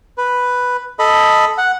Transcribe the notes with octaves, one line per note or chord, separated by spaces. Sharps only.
B4
A4 D#5 B5
F#5